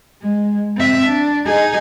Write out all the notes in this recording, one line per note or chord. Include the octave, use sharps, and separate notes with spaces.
G#3
C4 E5
D4
D#4 G#4